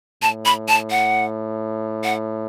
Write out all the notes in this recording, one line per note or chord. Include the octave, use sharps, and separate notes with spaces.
A2 A5
B5
A5
F#5
F#5